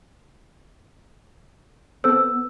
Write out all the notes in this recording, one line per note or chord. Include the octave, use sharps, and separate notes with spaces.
B3 C4 A4 C5 E6